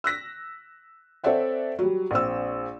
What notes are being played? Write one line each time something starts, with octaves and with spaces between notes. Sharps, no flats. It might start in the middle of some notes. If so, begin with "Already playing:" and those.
E6 F#6 A#6 B6
C4 A4 C#5 D5 E5 F#5
F#3 G3
A#1 C4 E6